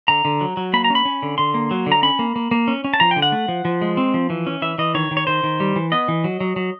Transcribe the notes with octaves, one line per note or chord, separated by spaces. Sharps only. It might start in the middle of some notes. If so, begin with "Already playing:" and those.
D3 A#5
D3
F#3
F#3
A#3 B5
A#5
C#4
B5
C#4
D3
D3 C6
A#3
F#3
D3
A#5
C#4 B5
A#3
A#3
A#3
C#4
C#4
A5
F3 A#5
G5
D3
F#5
A3
F3
F3
G#3
C4
F3
E3
C#4
E3 E5
E3 D#5
D#3 C#5
D#3
C#5
D#3 C5
D#3
G3
E3
B3 D#5
E3
F#3
F#3
F#3